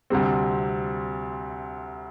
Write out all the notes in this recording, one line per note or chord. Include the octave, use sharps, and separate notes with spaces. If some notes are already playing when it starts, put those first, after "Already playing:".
D2 C3 G3 C4